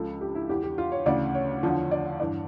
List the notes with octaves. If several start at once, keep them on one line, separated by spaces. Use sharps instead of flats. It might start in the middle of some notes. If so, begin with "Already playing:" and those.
Already playing: C#2 C#3 F3 A4
G4
E4
E2 E3 G4
G4
F4
C#5
D2 C#3 E3 D5
C#5
E2 D3 F3
D5
G2 E3 D5